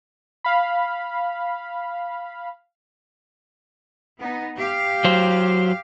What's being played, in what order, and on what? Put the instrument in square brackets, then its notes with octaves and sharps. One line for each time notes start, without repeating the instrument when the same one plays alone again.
[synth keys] F5 B5
[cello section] B3 D#4
G4 F5
[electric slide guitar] F#3 C5